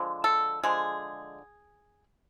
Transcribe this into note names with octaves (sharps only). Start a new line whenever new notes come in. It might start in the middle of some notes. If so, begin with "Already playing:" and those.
Already playing: D3 F3 G#3
A4
D3 F3 G#3 G#4